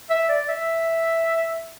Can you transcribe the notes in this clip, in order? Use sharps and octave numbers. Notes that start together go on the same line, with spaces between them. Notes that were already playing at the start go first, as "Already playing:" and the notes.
E5
D5
E5